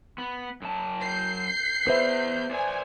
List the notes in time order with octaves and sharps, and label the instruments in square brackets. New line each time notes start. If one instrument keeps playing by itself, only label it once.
[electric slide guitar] B3
F#2 A5
[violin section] G6 C7
[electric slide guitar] B3 G#4 [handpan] B4 C5 E5
[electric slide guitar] C5 D5 [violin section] G#5